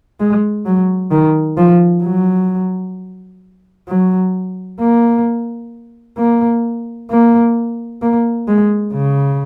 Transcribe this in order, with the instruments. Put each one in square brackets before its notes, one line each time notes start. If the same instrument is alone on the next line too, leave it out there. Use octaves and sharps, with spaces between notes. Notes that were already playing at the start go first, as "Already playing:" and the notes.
[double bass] G#3
F#3
D#3
F3
F#3
F#3
A#3
A#3
A#3
A#3
G#3
C#3